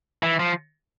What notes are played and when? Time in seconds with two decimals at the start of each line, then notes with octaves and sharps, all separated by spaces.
0.23 E3
0.40 F3